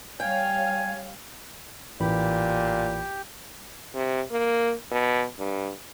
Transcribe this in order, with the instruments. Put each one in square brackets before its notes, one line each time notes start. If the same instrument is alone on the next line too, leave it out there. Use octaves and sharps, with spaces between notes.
[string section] G3 C#5 F5 [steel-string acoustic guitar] G5 [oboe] G#5
[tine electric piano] A1 E3 B5 [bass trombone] A#2 [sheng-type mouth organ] G4
[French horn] C3
A#3
B2
G2